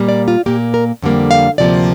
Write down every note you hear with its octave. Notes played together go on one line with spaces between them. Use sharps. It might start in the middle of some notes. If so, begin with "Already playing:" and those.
Already playing: A#2 G3 A#3
D5
F4
A#2 A#3 G4
A#4
F2 D3 G3 A#3
F5
D2 C3 F3 A#3 D5